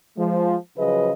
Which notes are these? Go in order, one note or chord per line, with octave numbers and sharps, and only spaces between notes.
F3 G#3
C#3 F3 F#3 G#4 B4 D#5